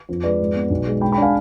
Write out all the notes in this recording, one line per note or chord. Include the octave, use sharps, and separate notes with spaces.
F2
G#3 B4 D5
G#2
B3
B1
G#3
G#2 G5 B5
G5 B5
D4 F5 G#5